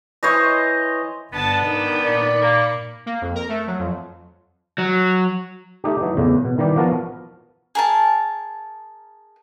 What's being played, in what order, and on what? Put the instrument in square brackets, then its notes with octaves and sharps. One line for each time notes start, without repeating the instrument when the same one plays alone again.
[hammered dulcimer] E3 C5 C#5 D#5
[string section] G1 F#5 A5 [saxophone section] B3 D4 [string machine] D#5
[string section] G#2 D#3 A#4 [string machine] D6 G6
[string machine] A#2 B5 C#7 [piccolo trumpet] D5
[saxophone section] A#3
[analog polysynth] A#3
F2
A#4
A3
F#3
F2
[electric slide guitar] F#3
[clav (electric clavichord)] A3 D#4 G4
E3 F#3 D#4
E2 A2 C#3
B2
D#3 E3 G3 G4
F3 B3 F#4 A#4 F5 A5
[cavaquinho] G#4 A#4 A5